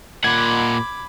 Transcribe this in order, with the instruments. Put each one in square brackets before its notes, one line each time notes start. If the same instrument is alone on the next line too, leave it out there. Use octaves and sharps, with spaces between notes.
[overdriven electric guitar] A#2 F#5 [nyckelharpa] B5 D6 [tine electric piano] G#6